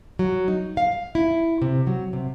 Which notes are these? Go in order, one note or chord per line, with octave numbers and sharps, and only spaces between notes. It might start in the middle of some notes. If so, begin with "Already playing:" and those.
F#3
D#4
F5
E4
C3
F#3
C3